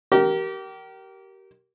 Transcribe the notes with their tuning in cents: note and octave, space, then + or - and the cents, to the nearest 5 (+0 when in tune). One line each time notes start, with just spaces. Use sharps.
G4 -30 A#4 +0